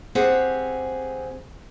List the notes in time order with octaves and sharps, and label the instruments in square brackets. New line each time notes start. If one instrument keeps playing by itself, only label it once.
[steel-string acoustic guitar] C4 G4 G#4 F#5